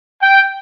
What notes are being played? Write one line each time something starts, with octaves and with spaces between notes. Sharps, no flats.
G5